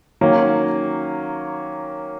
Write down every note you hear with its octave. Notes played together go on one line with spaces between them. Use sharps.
D#3 F#3 A#3 C#4